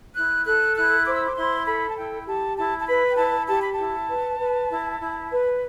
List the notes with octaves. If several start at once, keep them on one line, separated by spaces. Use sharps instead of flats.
E4 F#6
A4 F#6
E4 F#6
C5 D6
E6
D6
E4 C6
A4 B5
A5
E4 G5
G4 A5
E4 A5
A5
B4 B5
G5
E4 A5
G4 A5
B5
E4 A5
B4
B4
E4
E4
B4